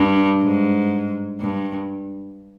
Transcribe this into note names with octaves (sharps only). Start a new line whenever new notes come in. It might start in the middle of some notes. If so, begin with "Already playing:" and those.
Already playing: G2
G#2
G2